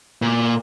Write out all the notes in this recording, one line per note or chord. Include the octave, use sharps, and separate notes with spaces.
A#2